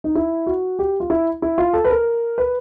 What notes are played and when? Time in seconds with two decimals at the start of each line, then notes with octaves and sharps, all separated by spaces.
0.04 D#4
0.15 E4
0.46 F#4
0.79 G4
1.00 F4
1.10 E4
1.42 E4
1.58 F4
1.73 A4
1.85 B4
1.90 A#4
2.38 B4